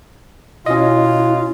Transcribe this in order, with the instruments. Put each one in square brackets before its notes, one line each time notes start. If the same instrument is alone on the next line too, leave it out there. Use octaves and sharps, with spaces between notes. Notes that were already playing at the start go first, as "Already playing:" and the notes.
[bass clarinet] B2 [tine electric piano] C#4 D#5 [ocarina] E4 [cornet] F4